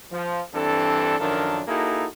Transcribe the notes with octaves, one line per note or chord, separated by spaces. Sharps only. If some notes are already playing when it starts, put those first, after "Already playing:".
F3
G2 E3 C4 D4 A4
F#2 D#3 F3 D4 A4 A#4
A#3 D#4 E4 F#4 G#4 A4